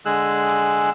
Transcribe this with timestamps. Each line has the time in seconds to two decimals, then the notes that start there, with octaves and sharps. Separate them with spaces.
0.06 D3 G#3 G#4 E6 F#6